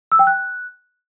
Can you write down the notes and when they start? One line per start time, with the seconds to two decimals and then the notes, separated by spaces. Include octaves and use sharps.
0.12 E6
0.19 G5
0.27 F#6